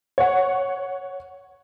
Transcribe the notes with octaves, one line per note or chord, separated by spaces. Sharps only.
C#5 F#5